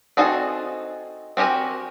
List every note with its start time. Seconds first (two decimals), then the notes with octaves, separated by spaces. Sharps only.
0.17 C4 D#4 F#4 G#4 A4
1.37 C4 F#4 G4 A#4 G#5